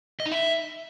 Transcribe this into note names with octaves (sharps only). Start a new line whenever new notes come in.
D#5
D#4
E5